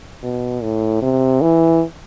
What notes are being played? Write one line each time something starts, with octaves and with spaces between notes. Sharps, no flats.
B2
A2
C3
E3